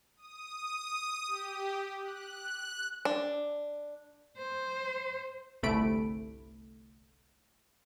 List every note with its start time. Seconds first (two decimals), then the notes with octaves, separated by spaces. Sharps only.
0.17 D#6
1.28 G4
2.02 F#6
3.05 D4
4.37 C5
5.63 G1 C2 A3 B5 D7